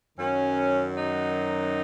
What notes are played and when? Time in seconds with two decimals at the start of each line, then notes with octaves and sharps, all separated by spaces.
0.18 F#2 D#3 F#3 C#4
0.96 D#4